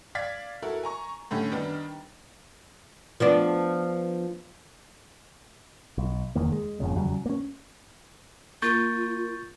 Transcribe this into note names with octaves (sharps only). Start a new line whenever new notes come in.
D5 F5 G#6 A6 B6
E4 F#4 A4 A#4
G#5 A#5 C#6
A2 D3 C#4 G4
D#3 G3 B3 D4
F3 B3 D4
B1
F1 E2 D#3 A#3
G#3
F#1 F2 A#2 C#3
E2 C#3 F#3 G3
A#3 C#4
A#3 F4 C#6 G6 A6